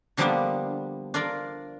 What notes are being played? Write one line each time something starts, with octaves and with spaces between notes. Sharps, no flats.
D3 F3 G3 A#3 B3 D4
D4 F4 A#4 D5